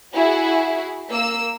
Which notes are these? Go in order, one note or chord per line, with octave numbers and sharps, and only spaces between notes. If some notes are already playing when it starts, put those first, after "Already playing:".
E4 F#4 G#4
A#3 E6